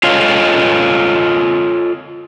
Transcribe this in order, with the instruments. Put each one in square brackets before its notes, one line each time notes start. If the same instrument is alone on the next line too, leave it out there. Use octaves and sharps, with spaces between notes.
[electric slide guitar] F4 A4 C#5 D#5 F5